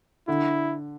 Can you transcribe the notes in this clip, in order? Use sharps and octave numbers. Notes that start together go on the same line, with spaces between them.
D3 E4